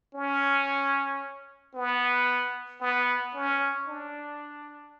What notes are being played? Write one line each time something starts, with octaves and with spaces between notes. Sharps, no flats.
C#4
B3
B3
C#4
D4